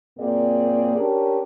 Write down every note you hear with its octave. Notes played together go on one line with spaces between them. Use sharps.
F#2 A#2 A#3 C4 G#4 D5
C#4 D4 G4 A#4